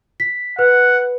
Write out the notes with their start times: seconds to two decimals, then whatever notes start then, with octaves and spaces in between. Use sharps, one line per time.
0.20 B6
0.59 B4 F#5